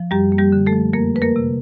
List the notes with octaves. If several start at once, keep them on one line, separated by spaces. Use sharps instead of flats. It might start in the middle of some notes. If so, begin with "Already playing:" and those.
Already playing: F3
F#2 G3 G4
A#3
G3 G4
D3
A3 A4
F3
F2 A#3 A#4
A3 B4
A#3 A#4
C3